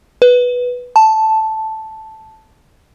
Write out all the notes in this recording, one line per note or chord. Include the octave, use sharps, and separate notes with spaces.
B4
A5